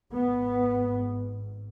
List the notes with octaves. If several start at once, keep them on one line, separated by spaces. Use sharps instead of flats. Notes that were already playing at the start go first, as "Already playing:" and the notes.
G#1 G#2 B3